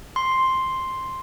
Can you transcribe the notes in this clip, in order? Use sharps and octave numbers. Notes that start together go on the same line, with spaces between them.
C6